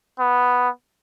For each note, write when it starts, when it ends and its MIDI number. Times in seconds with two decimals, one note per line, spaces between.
0.20 0.69 59